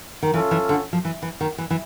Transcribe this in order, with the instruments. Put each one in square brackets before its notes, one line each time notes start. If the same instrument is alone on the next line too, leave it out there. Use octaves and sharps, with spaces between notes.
[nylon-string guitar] D#3
[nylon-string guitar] E3 [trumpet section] C#4 F4 A4
[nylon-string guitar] E3
D3
F3
E3
E3
D#3
E3
E3